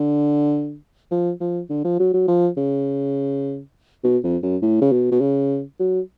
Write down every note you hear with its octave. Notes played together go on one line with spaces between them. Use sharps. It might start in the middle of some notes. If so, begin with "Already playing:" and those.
Already playing: D3
F3
F3
D3
F3
F#3
F#3
F3
C#3
B2
F2
F#2
A2
C#3
B2
B2
C#3
F#3